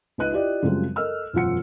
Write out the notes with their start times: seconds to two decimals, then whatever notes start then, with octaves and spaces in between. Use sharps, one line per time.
0.18 C#2 D#4 B4 D#5 F#6 D#7
0.32 E4 F4 G4 D5 D#5
0.62 F#2 C#3 F3 G3 G#3 C4
0.96 A4 A#4 D#5 E6 F6
1.33 E1 F#2 F3 F4 F#5 C#7